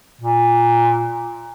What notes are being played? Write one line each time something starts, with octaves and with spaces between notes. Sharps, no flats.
A#2